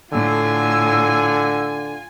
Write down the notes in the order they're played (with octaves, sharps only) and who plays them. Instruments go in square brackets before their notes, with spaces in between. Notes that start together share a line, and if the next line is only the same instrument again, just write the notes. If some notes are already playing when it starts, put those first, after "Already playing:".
[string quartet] A2 [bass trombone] D3 [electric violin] F4 G#5 [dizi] E6